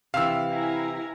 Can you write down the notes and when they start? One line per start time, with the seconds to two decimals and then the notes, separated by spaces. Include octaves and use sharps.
0.14 C3 E3 F5 E6
0.49 E4 G#5 A#5